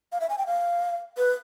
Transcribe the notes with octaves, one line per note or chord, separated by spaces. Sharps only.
F5
E5
G#5
G5
F5
B4